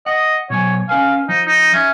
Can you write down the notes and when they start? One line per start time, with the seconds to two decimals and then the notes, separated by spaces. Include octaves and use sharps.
0.06 D#5 F#5
0.50 B2 F#3 C#5 G#5
0.89 C#4 B4 F5 G#5
1.29 F3 D#4
1.47 D#4
1.74 C#4 E5